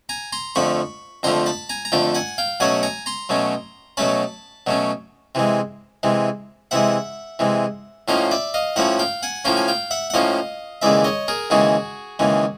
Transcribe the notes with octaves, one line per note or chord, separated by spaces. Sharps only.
G#5 A#5
A#5 C6
F2 D3 F3 A3 B5 C#6
F2 D3 F3 A3 A#5 C6
A5 B5
G#5 A#5
A#5
F2 D3 F3 A3 G5 A5
F#5 G#5
F5 G5
B2 F#3 A3 C#4 F#5 G#5
G#5 A#5
A#5 C6
B2 F#3 A3 C#4
B2 F#3 A3 C#4 A5 B5
B2 F#3 A3 C#4
C3 E3 G#3
C3 E3 G#3
C3 E3 G#3 E5 F#5
C3 E3 G#3
A2 F3 A#3 C#4 D#5 F5
D5 E5
D#5 F5
A2 F3 A#3 C#4 E5 F#5
F5 G5
F#5 G#5
A2 F3 A#3 C#4 F5 G5
G#5
F5 G5
E5 F#5
F#5
A2 F3 A#3 C#4 D#5 F5
D#2 C#3 E3 G#3 D5 E5
C#5 D#5
G#4 A#4
D#2 C#3 E3 G#3 F#4 G#4
D#2 C#3 E3 G#3